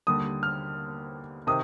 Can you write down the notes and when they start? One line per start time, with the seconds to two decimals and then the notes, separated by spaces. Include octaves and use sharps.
0.07 D#2 D3 G3 D#6
0.43 F6
1.47 C3 D#3 D#6